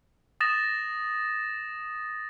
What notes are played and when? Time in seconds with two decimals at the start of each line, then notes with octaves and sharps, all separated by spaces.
0.41 D#6 A6 A#6 E7